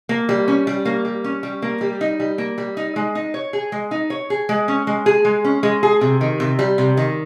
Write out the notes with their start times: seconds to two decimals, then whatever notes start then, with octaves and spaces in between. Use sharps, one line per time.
0.09 A#3
0.29 G3
0.48 C#4
0.67 G3
0.85 A#3
1.05 G3
1.24 C#4
1.43 G3
1.62 A#3
1.81 G3
2.01 D#4
2.20 G3
2.38 A#3
2.58 G3
2.77 D#4
2.96 G#3
3.15 D#4
3.34 C#5
3.53 G#4
3.72 G#3
3.91 D#4
4.10 C#5
4.30 G#4
4.49 G#3
4.68 C#4
4.87 G#3
5.06 G#4
5.25 G#3
5.45 C#4
5.63 G#3
5.83 G#4
6.01 C3
6.21 D#3
6.40 C3
6.59 G3
6.78 C3
6.97 D#3